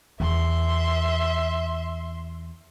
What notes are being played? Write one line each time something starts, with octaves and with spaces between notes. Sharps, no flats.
E2 E5 C6